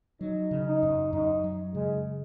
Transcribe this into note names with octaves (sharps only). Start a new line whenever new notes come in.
F#3 D#4
C#3
D#4
F#2
F#2 D#4
F#3
C#3 G#3